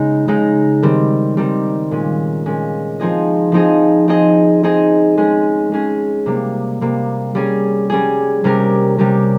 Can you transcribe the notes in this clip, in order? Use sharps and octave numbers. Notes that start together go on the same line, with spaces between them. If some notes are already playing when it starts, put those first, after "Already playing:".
Already playing: C#3 G#3 D#4
C#3 G#3 D#4
D#3 G3 C4
D#3 G3 C4
A#2 G#3 C#4
A#2 G#3 C#4
F3 C4 D#4 G#4 D#5
F3 C4 D#4 G#4 D#5
C4 D#4 G#4 D#5
C4 D#4 G#4 D#5
G#3 C#4 G#4
G#3 C#4 G#4
C3 G3 A#3
C3 G3 A#3
G3 C#4 G#4
G3 C#4 G#4
C3 G3 C#4 G4 A#4
C3 G3 C#4 G4 A#4